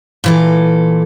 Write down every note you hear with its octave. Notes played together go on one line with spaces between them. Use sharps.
A#2 E3 A4